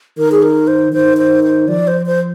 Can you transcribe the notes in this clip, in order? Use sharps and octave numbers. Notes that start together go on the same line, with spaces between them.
D#3 A#4
G#4
A#4
C5
D#3 C5
C5
C5
F3 D5
C5
C5